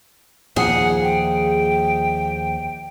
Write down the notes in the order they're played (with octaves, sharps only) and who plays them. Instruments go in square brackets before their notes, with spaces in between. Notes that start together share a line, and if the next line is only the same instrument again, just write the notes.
[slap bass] D#2 A#2 F3 [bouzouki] G#4 [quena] F#5
[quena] G5